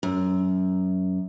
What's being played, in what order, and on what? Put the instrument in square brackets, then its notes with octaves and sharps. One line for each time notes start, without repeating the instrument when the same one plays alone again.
[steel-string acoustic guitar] F#2